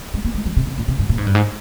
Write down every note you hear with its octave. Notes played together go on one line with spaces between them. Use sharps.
G#3
A#3
G#3
F3
C3
C3
A#2
C3
G2
A#2
G#2
G2
G#2